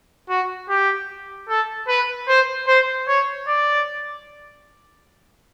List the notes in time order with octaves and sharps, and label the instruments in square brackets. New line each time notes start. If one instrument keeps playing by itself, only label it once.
[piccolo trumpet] F#4
G4
A4
B4
C5
C5
C#5
D5